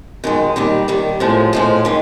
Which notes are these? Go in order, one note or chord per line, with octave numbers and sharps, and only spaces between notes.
F#2 D#3 G#3
D#2 D#3 G3
D#2 D#3 G3
A2 F3 G#3
A2 F3 G#3
D#3 G#3